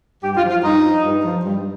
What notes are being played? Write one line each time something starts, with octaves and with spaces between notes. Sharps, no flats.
G2 G4
F4
F3
F4
G2 D#4
F3
G2
F3
G2